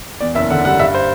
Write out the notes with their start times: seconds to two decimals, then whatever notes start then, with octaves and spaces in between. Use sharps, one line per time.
0.20 E2 D5
0.35 F#1 E5
0.50 D3 F#5
0.65 G3 F#5
0.80 G2 E5
0.94 C5